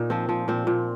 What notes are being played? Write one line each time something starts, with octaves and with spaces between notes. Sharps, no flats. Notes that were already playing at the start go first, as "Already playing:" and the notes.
Already playing: A#2 D#4
F3 C4
F3
A#2 C4
A#2